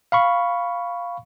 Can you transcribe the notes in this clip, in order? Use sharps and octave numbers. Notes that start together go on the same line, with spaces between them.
F5 B5 C#6